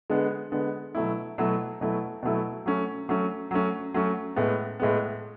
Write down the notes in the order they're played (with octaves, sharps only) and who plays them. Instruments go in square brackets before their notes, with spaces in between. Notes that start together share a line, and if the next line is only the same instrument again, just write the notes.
[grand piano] D3 G#3 B3
D3 G#3 B3
B2 F#3 A3 E4
B2 F#3 A3 E4
B2 F#3 A3 E4
B2 F#3 A3 E4
F#3 A3 C#4
F#3 A3 C#4
F#3 A3 C#4
F#3 A3 C#4
A2 G#3 B3
A2 G#3 B3